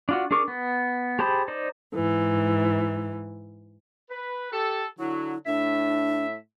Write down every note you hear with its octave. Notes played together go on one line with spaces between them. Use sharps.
D4 F4 F#4
D4 G#4 A#4 C#6 D6
B3
G4 G#4 C5 A5 B5
D#4 C5 D5
G#2 E3
B4
G4 A4
D3 F#3 E4
A2 D4 E5